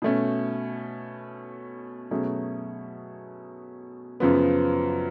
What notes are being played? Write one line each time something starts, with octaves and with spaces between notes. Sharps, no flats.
B2 A3 C#4
B2 F#3 A3 C#4 G#4
F#2 C#3 F3 B3